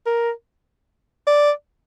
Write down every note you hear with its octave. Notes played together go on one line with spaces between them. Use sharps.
A#4
D5